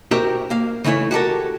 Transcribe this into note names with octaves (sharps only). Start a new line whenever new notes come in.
F#4 G4 A#4 C5 E5
A#3 F5
C#3 E3 A3 E4 C#5
F#4 G4 A4 A#4